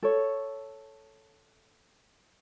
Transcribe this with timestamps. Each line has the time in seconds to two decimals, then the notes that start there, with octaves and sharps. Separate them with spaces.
0.03 A4 C#5